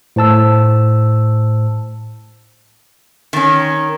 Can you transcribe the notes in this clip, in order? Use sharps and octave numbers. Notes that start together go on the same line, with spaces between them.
A2 C5 A5 E6
D#3 C#4